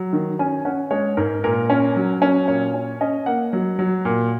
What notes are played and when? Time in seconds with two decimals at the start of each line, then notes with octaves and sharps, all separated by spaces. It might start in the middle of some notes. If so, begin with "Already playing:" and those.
Already playing: F#3
0.13 D#3
0.39 C#4 G#5
0.65 C#4 F#5
0.91 G#3 C#5
1.17 G#2 A#4
1.44 A#2 A#4
1.70 C#4
1.96 F#3
2.22 C#4
2.48 A#2 C#5
2.74 C#4
3.01 C#4 D#5
3.26 A#3 F#5
3.53 F#3
3.79 F#3
4.05 A#2